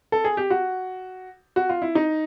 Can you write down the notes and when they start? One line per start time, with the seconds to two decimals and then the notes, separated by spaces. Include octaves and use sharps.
0.12 A4
0.24 G#4
0.37 G4
0.50 F#4
1.56 F#4
1.69 F4
1.82 E4
1.95 D#4